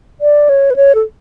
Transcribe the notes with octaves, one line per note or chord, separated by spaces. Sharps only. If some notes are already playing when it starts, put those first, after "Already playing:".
D5
C#5
B4
C#5
A4